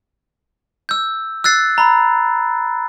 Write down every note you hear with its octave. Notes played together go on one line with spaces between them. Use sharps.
E6 G6
E6 F#6 A6 C7
A#5 B5